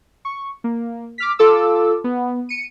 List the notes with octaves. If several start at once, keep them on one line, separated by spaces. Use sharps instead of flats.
C#6
A#3
D6 F6 B6
F4 A4 D6 E6
B3
C#7 D#7